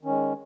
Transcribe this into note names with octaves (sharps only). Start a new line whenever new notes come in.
D#3 G#3 C#4